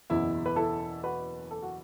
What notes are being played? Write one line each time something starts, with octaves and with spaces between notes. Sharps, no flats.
F#1 E2 B2 E4
B4
E4 A4
F#4 B4
A4
F#4